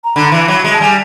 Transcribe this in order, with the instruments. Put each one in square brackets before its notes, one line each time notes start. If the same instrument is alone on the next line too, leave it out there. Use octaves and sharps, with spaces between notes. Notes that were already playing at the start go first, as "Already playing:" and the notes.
[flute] A#5
[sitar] D3 [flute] B5
[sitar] E3 [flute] B5
[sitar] F#3
G#3
[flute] A5
[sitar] G3 [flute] G#5